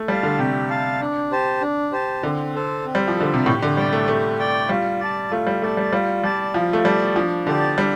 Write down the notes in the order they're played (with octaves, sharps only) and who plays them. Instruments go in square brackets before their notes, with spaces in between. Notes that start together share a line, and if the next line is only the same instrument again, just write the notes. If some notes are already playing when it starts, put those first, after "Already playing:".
Already playing: [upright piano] A3
[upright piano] G3 [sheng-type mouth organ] F5 A5
[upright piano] D3
[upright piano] C3 [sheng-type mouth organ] G4
[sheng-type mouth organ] F5 A5
D4
G4 C5 A5
D4
G4 C5 A5
[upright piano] D3 [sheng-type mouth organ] C4
[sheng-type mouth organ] A4 C5
C4
[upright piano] G3
F3
[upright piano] D3 [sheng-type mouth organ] A4 C5
[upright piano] C3
[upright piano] A2 [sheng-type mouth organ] G4
[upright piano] D3
[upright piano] G3 [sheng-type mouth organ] G5
[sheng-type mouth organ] D5
[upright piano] A3
[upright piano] A3 [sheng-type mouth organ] G4
[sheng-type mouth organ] D5 G5
[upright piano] G3 [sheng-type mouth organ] F4
[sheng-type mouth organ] D5 A5
[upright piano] A3 [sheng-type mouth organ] F4
[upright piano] G3
[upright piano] A3 [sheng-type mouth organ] D5 A5
[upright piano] G3
[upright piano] G3 [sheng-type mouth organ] F4
[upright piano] G3 [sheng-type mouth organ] D5 A5
[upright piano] F3 [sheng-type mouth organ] F4
[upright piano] A3
[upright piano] G3 [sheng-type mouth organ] D5 A5
[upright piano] F3 [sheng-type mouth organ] D4
[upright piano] D3 [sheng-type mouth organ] G4 D5 A5
[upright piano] G3 [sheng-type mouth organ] D4